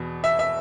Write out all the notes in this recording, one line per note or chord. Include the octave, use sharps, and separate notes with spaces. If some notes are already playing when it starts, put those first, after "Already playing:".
Already playing: E2 B2
E5
E5